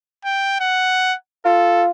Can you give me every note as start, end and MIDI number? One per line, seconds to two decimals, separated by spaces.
0.25 0.58 79
0.60 1.15 78
1.45 1.90 65
1.45 1.84 69